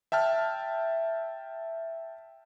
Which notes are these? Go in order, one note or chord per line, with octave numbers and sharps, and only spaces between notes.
E5 G5 A5 F6